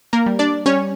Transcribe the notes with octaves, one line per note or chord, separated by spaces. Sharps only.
A#3 A#4
G3
D4 D5
G3 C#4 C#5